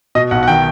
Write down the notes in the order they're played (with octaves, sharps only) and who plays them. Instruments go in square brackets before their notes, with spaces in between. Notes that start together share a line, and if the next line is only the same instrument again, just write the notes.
[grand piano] B2 D#5
B1 F#5
F#5
D#3 G5